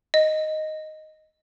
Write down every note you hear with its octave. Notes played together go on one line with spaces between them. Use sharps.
D#5